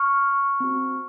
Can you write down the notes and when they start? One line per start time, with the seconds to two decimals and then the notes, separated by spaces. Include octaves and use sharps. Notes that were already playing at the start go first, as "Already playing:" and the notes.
Already playing: C#6 F6
0.60 C4 F#4